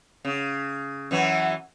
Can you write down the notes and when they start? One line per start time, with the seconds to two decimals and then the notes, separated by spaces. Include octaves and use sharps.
0.25 C#3
1.11 F#2 E3 F#3